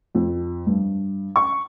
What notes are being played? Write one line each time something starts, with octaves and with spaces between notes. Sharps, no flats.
F2
G2
C#6